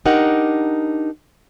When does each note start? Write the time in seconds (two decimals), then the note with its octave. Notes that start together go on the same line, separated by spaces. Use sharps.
0.05 D4 D#4 G4 A#4 F#5